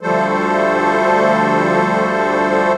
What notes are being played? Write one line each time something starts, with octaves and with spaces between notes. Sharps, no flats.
D2 F3 G3 A3 A4 C5